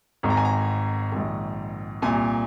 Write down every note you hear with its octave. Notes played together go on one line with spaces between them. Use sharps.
G#1 G#2 D#3
A#5
G#5
A#5
A#1 G#2 D#3
C2 A#2 G#5